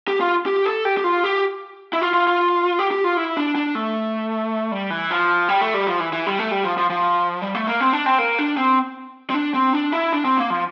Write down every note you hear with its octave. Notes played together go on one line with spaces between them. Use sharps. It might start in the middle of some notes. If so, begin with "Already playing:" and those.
G4
F4
G4
A4
G4
G4
F4
G4
E4
F4
F4
F4
G4
G4
F4
E4
D4
D4
A3
G3
E3
F3
G3
A3
G3
F3
E3
E3
G3
A3
G3
F3
F3
F3
G3
A3
A#3
C4
D4
C4
A#3
D4
C4
C4
D4
C4
D4
E4
D4
C4
A#3
F3